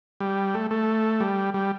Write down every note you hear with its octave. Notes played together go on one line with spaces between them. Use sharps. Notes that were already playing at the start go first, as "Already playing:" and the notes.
G3
A3
A3
G3
G3